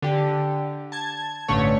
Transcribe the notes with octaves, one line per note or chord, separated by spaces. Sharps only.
D3 G4
A5 G#6
A1 G2 D3 A3 C#5